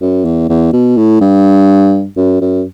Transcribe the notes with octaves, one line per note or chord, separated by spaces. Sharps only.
F#2
E2
E2
B2
A2
G2
F#2
F#2